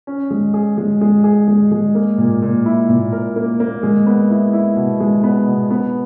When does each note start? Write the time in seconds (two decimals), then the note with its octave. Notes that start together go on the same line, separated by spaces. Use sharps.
0.07 C#4
0.30 G#3
0.54 G#4
0.78 G#3
1.01 G#3
1.24 G#4
1.48 G#3
1.72 G#3
1.95 A#3
2.18 A#2
2.42 A#2
2.65 E4
2.89 A#2
3.12 A#4
3.36 A#3
3.60 A#3
3.83 G#3
4.06 B3
4.30 E4
4.53 E4
4.76 B2
5.00 G#3
5.23 B3
5.47 B2
5.71 B3